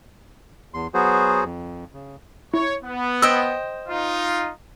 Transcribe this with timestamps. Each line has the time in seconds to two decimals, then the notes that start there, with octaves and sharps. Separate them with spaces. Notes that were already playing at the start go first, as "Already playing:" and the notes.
0.74 E2 C6
0.94 F#3 B3 F#4 G#4 C5
1.44 F2
1.94 C#3
2.54 E4 C#5
2.84 B3
3.22 C5 D#5 G5 E6
3.88 D#4 F4